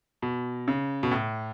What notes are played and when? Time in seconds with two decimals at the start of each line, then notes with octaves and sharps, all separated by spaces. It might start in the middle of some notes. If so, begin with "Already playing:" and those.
0.22 B2
0.68 C#3
1.03 B2
1.11 A2